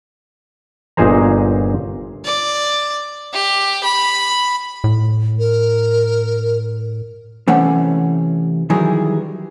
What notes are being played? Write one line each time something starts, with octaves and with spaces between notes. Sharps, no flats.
G1 A#2 D#4 G#4 C5 A#5
D5
G4
B5
A2
A#4
C3 E3 A3 C#4 C#5 F#5
D#3 E3 F#3 G3 G#4